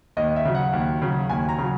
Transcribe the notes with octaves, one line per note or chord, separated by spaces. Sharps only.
D#2 D#5
E5
C#3 F#3
F#5
D#2
C#3 F#3
D#2 G#5
A#5
C#3 F#3